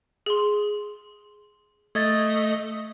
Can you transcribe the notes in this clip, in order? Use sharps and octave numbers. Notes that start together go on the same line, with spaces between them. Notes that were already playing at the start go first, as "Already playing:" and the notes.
G#4 C6
A3 D#5 G#6 A6